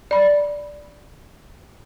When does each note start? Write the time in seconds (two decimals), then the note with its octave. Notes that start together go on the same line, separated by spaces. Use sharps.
0.11 D5 B5